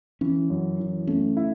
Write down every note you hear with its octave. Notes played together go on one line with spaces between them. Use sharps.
E3 C#4
F#2
E3
A3 C#4
E4